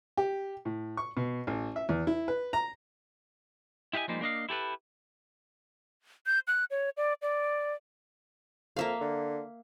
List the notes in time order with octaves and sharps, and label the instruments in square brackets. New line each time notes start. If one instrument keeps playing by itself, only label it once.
[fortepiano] G4
A2
C#6
B2
A1
E5
E2
E4
B4
A#5
[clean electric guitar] E4 G4 D#5 F5 G#5
F3 G3 G#3 A#3 D#4
A#3 D4 D#5 F5
E4 G4 A4 B4
[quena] G6
F#6
C#5
D5
D5
[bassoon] F2 [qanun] A#3 E5 F5
[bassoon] D3